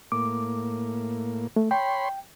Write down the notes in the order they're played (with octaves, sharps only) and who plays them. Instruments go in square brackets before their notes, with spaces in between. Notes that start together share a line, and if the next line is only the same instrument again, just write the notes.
[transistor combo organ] A2 A#3 [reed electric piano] D6
[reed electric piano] A3
[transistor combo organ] C#5 B5 C6 [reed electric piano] G5